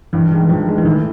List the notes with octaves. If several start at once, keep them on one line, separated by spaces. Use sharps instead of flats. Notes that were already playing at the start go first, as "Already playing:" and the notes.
G2 E3
D#3 E3 G#3
G2 F3
D#3 G#3
E3
A2 D#3